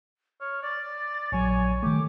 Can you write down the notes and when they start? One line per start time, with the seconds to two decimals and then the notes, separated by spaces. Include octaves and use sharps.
0.41 C#5 F6
0.63 D5 A6
1.32 A#1 F#3 C#5 G#5
1.83 D#3 A3 G4 D6